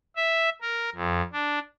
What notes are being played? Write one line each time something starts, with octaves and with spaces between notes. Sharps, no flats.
E5
A#4
F2
D4